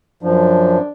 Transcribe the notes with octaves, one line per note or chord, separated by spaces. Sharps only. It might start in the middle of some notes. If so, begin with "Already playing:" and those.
F#2 F3 D4